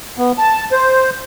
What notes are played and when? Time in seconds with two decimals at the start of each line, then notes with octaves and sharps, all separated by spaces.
0.18 B3
0.38 A5
0.72 C5